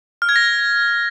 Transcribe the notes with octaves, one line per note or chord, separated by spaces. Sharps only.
F6
G#6
A#6